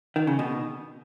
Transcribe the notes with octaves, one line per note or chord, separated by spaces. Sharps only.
D#3
C#3
B2